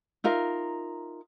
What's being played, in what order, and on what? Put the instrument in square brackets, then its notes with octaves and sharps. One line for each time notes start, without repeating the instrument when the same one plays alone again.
[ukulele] D#4 F4 A#4 E5